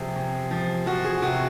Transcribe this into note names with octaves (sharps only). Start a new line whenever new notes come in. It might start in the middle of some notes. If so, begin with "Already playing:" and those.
Already playing: C3 F3 G#4
C3
F3
F3 F#4
G#4
C3 F#4